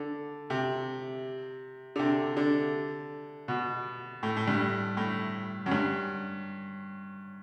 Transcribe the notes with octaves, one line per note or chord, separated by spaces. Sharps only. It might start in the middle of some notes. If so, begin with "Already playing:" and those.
Already playing: D3
C3
D3
C3
D3
B2
A2
A2
G2
A2
F#2
G2